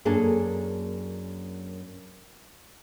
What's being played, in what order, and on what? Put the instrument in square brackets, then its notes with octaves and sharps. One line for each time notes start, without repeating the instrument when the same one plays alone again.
[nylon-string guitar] F#2 A#3 D4 G#4 A4